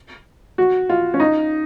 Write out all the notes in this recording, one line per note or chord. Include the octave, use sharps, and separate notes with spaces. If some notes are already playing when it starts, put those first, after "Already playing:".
F#4
F4
C#4
D#4